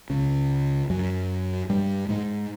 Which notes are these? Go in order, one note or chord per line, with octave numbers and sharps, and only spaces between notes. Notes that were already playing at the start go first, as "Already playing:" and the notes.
C#2 C#3
F#2 F#3
G2 G3
G#2 G#3